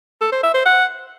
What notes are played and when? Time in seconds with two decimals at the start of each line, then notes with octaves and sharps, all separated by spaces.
0.21 A4
0.32 C5
0.43 E5
0.54 C5
0.65 F#5